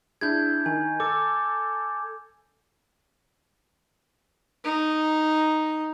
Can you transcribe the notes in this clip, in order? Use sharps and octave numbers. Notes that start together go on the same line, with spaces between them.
D4 E4 G#4 G6 G#6
D#3 G#5
A4 D6
D#4